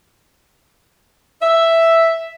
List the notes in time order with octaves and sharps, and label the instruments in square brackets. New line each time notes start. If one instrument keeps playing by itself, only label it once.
[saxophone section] E5